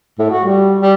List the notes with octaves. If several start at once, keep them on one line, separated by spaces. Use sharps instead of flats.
A2
F#4
G3
G3